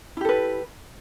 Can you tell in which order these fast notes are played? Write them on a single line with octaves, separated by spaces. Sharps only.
E4 G4 A4 B4